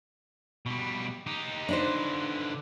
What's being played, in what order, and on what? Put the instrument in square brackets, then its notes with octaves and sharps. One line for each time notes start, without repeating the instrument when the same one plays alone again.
[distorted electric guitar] B2 G3
D#4 G4
[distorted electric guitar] D3 B4 [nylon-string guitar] D4 D#4 C5